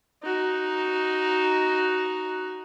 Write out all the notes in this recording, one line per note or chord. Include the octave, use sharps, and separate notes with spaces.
D#4 F#4